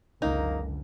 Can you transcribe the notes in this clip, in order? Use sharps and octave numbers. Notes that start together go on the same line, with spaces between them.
F#1 C#2 D3 A#3 D#4